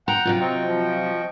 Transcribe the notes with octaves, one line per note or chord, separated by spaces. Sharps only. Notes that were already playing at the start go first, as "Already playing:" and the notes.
F#5 G5 A#5
C3 F#3 F4
C4 D#5 G5 C#6
F3